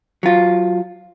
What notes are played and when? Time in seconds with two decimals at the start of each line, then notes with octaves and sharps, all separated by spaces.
0.23 F#3 F4